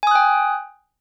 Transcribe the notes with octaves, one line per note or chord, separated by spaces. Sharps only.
G5 G#5 D#6 F#6